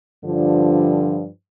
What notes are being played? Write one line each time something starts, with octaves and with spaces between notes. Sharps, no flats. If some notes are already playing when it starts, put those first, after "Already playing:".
G2 D3 F3